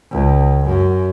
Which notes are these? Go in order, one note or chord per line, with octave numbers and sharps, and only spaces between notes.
C#2
F#2